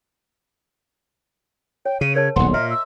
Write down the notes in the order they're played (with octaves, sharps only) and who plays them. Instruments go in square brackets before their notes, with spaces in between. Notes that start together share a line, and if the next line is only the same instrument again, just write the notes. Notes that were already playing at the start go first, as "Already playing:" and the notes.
[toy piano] C#5 [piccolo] G5
[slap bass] C#3 [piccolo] D#7
[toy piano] A#4 C#5 A5 [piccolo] G#6
[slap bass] D#1 B1 [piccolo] F#5 [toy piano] C6
[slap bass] A#2 [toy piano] D#5 E5 A#5 [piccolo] F6
[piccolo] E6